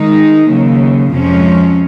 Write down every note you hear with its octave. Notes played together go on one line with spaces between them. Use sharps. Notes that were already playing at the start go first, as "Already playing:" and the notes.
Already playing: D#3 G#3 D#4
D#2 C#3 F#3
F2 C3 F3 G#3 C#4